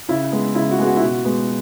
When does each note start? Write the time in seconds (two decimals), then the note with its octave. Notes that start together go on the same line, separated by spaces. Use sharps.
0.09 C#3 E4
0.32 G#3 B3
0.55 C#3 E4
0.71 F#4
0.79 G#3 B3 G#4
0.87 F#4
0.97 E4
1.01 B2 F#4
1.25 G#3 B3